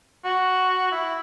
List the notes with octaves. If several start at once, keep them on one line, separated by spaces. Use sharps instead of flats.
F#4
E4